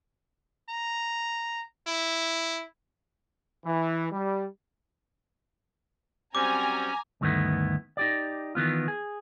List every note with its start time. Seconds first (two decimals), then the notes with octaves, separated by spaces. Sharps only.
0.69 A#5
1.87 E4
3.64 E3
4.11 G3
6.35 F#3 G3 C4 C#4 G#5 A#5 D6
7.21 D2 G2 D#3 A3 B3 E4
7.97 D#4 G4 D5
8.55 D#3 E3 B3 F4
8.88 G#4